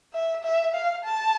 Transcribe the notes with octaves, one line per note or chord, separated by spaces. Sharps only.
E5
E5
F5
A5